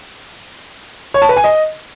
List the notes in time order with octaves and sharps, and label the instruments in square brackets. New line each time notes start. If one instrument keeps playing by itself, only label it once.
[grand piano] C#5
A5
B4
G#5
D#5